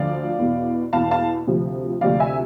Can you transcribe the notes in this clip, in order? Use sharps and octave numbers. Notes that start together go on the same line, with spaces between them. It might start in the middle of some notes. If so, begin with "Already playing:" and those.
Already playing: D2 D3 F3 D5 F5
E2 B2
E2 B2 F5 A5
F5 A5
D2 C3 F3
D2 C3 F3 D5 F5
E5 G#5